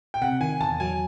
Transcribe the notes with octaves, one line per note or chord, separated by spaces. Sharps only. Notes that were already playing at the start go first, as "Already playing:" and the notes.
G5
C3 F#5
D#3 G#5
E2 A5
F#3 G#5